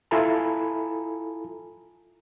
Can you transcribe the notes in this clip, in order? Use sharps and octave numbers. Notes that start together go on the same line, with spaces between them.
E4 F4 A4 G#5 A#5 B5